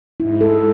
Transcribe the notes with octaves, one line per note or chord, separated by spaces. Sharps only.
G#2 E4
A4